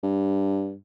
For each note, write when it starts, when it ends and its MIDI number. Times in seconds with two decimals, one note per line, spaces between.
0.03 0.74 43